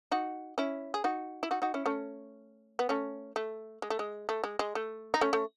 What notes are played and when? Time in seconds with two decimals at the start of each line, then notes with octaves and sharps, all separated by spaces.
0.11 D#4 F#4
0.58 C#4 E4
0.94 G#4
1.04 D#4 F#4
1.43 E4
1.51 D#4 F#4
1.62 D#4 F#4
1.74 C#4 E4
1.86 A3 C#4
2.79 B3
2.89 A3 C#4
3.36 A3
3.82 G#3
3.90 A3
3.99 G#3
4.29 A3
4.44 G#3
4.59 G#3
4.75 A3
5.14 D#4
5.21 A3 C#4
5.33 A3